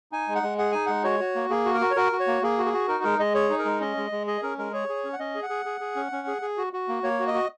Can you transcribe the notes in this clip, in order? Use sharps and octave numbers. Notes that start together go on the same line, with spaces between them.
D#4 G#5
G#3
F#5
G#3
G#4 F#5
D#4 G#5
G#3 F#5
F#4 C#5
F#4
A#3
A#3 G#4
F#4
A#4
F#4
C#5
F#4 A#4
F#4
C#5
A#3
A#3 G#4
F#4
G#4
F#4
D#4 A#4
G#3 A#4
G#3 D#5
G#4 C#5
D#4
A#4
G#3
C#4 D#5
G#3
G#3
G#4 D#5
C#4 A#4
G#3 A#4
G#4 C#5
G#4
C#4
F#5
C#4 D#5
G#4
F#5
G#4
G#4
G#4
C#4
C#4
G#4
G#4
F#4
F#4
A#3
A#3 C#5
F#4
D#5
F#4